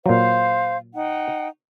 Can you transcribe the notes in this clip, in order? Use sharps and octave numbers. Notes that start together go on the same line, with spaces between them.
A#2 F#3 C5 F5
D#4 F#5 G5